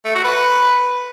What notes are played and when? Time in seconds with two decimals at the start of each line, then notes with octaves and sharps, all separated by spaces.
0.05 A3
0.15 F#4
0.25 B4